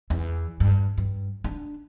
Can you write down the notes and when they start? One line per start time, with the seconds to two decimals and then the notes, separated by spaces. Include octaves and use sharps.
0.10 E2
0.60 G2
0.98 G2
1.44 D4